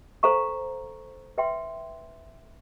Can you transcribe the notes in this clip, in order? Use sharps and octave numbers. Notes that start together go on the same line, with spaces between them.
A4 C5 F5 A#5 C#6
B4 E5 G5 C6